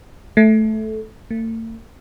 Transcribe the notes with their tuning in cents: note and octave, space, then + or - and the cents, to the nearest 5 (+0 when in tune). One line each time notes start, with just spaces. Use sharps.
A3 -10
A3 +45